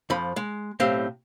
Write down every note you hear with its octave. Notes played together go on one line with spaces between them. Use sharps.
F2 F3 B5
G#3
B1 A2 C4 G4 F5